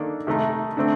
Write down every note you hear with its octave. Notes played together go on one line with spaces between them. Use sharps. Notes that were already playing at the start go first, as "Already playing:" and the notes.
Already playing: D#3 A#3 D4 A4
C3 D#3 A3 D#4
D3 A3 C4